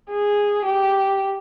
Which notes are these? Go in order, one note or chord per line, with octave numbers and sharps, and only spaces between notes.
G#4
G4